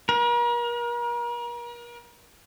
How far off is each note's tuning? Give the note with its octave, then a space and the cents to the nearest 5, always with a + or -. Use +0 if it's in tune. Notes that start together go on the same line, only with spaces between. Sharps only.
A#4 +40